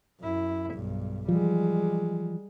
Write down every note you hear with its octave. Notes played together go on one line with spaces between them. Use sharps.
F#2 E4
B1 G2
E3 F3 G3 G#3